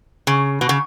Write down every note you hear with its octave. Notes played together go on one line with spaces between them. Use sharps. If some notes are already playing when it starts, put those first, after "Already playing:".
C#3
B2
C#3